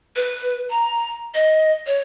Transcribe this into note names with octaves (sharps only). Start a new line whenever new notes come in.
B4
A#5
D#5
C#5